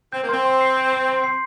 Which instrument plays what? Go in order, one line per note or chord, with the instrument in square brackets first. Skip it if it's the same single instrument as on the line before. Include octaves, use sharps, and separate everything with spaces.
[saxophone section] C4 [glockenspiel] G6
[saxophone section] A#3
[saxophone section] C4 [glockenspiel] C6
[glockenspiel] C6
C7
G6
C6
C6
C7